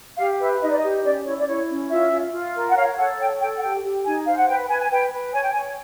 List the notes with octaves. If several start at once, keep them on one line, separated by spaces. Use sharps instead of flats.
G4 F5
B4 E5
D#4 D#5
D5
D#5
G4
C#4 D5
E4 C#5
D5
E4 C#5
C#4
F4 E5
F4
F4
A#4
F#5
C#5 F5
A4 F#5
C#5 G5
A4 G5
F#5
G4 G5
G4
D#4 G#5
C5 F5
F#5
B4 G5
B4 G#5
G#5
B4 G5
B4
C#5 G#5
G5
G#5
C#5